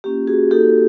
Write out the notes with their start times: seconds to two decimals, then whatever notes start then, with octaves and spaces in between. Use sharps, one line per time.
0.04 A#3 C#4 F4 G4
0.27 F#4 G#4
0.51 A#3 D#4 F#4 G4 A4